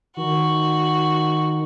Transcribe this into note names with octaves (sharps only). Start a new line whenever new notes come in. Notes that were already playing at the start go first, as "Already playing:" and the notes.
D#3 F#4